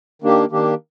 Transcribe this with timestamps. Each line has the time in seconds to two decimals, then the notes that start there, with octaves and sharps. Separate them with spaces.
0.22 D#3 A#3 D4 G4
0.51 D#3 A#3 D4 G4